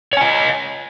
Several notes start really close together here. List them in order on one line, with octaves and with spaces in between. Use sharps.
C#5 G#5 D#5